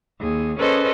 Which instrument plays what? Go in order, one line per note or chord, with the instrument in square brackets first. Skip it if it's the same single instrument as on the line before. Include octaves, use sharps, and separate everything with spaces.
[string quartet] D#2 G#4
C#4 G#4 A4 B4 C5 D#5